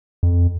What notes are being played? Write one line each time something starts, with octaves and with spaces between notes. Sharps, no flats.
F2